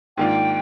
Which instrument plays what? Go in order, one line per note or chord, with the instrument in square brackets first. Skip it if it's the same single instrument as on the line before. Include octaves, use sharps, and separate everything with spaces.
[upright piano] G#2 D#3 A#3 D4 F4 [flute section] G5